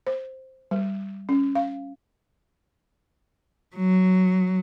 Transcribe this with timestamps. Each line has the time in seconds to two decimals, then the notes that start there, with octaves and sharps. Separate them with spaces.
0.07 C5
0.71 G3
1.29 C#4
1.55 F5
3.76 F#3